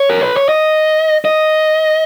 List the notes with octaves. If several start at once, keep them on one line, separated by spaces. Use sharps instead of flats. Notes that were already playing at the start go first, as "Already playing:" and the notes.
Already playing: C#5
A#4
B4
C#5
D#5
D#5